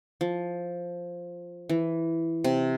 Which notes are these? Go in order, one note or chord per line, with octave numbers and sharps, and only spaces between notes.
F3
E3
C3